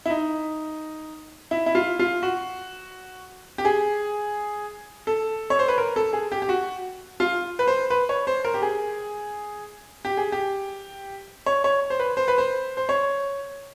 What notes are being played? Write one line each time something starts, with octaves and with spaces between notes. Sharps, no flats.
E4
D#4
E4
E4
F4
F4
F#4
G4
G#4
A4
C#5
C5
B4
A#4
A4
G#4
G4
G4
F#4
F4
B4
C5
B4
C#5
C5
A#4
G4
G#4
G4
G#4
G4
C#5
C#5
C5
B4
C5
B4
C5
C5
C#5